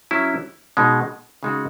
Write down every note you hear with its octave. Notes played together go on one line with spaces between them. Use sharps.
F#3 C#4 E4
B2 G#3 B3 D#4
C#3 G#3 D#4 F#4